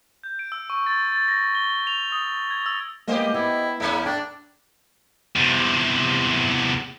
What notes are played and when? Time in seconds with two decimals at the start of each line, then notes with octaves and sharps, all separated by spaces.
0.24 G6
0.39 D7
0.52 E6
0.70 C#6
0.86 A6
1.12 A6
1.28 A#6
1.55 G7
1.87 F7
2.12 D#6
2.51 G#6
2.66 E6
3.07 G#3 A#3 B3 G4 C5 D#5
3.34 B3 E4
3.80 E2 G#3 A#3 C#4 E4
4.06 D4 G5
5.36 E2 C3